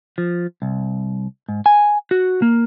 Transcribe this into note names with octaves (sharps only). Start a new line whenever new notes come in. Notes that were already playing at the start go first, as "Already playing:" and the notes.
F3
C2
G#2
G#5
F#4
A#3